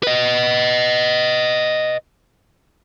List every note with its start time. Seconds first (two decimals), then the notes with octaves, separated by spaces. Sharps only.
0.03 B4 D#5